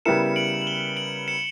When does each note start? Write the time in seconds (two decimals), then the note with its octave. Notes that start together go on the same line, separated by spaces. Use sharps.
0.05 C#3 G3 B3 E4 A#4 C#7 E7
0.36 D7 F#7
0.62 F#7
0.67 E7 G7
0.96 D7 F#7
1.28 C#7 E7